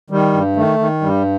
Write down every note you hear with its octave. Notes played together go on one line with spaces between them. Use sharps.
D#3 G3
G2
D#3 A3
D#3
G2 G3